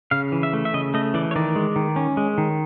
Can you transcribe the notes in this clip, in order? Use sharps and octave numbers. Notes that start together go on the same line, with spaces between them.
C#3 F5
E3
E5
A3
E5
C#3 D#5
A3 D#5
E3 D5
C#5
D#3 D5
G#3
D#3
C#4
G#3
D#3